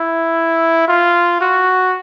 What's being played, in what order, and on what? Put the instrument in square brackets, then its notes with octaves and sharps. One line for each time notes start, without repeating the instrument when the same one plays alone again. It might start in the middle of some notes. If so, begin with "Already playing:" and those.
Already playing: [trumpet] E4
F4
F#4